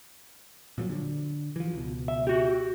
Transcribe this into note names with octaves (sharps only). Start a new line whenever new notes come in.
A#2 F3 F#3
D3
E3 F3
C#2 B2
E5
F#4 G4